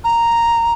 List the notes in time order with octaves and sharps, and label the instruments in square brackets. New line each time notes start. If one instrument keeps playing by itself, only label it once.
[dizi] A#5